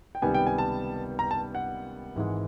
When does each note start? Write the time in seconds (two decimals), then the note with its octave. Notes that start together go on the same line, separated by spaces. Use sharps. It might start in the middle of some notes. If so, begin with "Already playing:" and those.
0.15 G5
0.22 C#2 C3 D#3 G3 B3 G#5
0.34 G5
0.47 G#5
0.58 A5
1.19 A#5
1.31 A5
1.55 F#5
2.15 G#1 G#2 E3 G#3